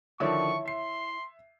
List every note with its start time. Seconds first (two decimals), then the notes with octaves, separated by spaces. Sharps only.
0.20 D3 D#3 F3 E4 C#5 C#6
0.66 E5 C6 C7